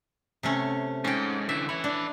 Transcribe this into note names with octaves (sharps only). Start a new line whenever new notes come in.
C3 A3 C#4
G#2 C#4 G5
D3 E3 E5
B4 C#5 E5
D4